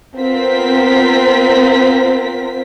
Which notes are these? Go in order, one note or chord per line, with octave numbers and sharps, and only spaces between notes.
B3 C4 F4 A#4 C5 B6